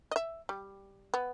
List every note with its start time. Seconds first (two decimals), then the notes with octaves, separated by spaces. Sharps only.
0.11 D#5 E5
0.49 G3
1.14 B3